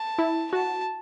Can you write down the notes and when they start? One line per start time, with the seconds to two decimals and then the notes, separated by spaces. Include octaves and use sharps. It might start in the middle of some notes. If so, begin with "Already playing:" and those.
Already playing: A5
0.18 E4
0.52 F#4 A5